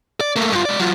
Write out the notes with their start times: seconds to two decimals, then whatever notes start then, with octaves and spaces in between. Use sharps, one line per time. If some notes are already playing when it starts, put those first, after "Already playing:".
0.21 D5
0.36 A3 A#3
0.52 G2 F4
0.65 G#3 D5
0.80 F#3 F4